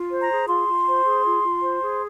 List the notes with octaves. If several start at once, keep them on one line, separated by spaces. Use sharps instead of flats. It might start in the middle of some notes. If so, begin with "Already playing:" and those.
Already playing: F4
C5
A#5
G#4
F4 C6
F4
C5
G#4
F4
F4
C5
G#4